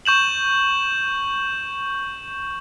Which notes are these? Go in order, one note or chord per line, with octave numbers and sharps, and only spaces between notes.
C#6 G6 E7 F#7